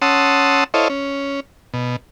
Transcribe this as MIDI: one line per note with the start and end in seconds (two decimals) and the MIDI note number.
0.02 0.64 61
0.02 0.64 78
0.02 0.64 81
0.02 0.64 84
0.02 0.64 87
0.02 0.64 88
0.74 0.88 64
0.74 0.88 69
0.74 0.88 72
0.74 0.88 73
0.74 0.88 75
0.74 0.88 77
0.90 1.40 61
1.74 1.96 47